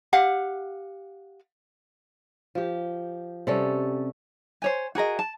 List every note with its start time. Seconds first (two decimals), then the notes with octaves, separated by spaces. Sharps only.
0.13 G4 F5 F#5
2.55 F3 G4
3.47 C3 G3 C#4 A4
4.62 C5 C#5 G#5
4.95 F#4 G#4 A#4 D#5
5.19 A5